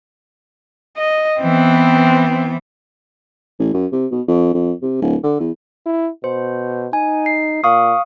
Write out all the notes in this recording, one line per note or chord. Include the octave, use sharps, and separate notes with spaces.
D#5
E3 B3 C4
A1
F#2
C3
B2
F2
F2
C3
D1
D3
E2
E4
B2 C5
D#4 G#5
C7
A#2 F5 C#6 D#6